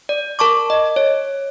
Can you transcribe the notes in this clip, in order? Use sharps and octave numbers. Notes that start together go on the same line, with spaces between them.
D5
A#4 A5 C#6 D6
D#5
C#5